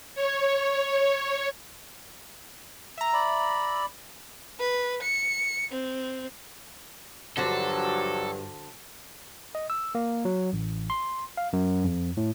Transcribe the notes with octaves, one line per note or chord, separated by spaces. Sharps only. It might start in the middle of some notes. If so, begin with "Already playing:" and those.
C#5
E5 A#5
D5 B5
B4
C#7
C4
G2 D3 F3 F#3 F#4 A4 C5
D#5
E6
A#3
F#3
A1
C6
F5
F#2
F2
A2